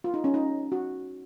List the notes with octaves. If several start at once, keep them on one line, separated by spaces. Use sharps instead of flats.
F4
D#4
C#4
D#4
F#4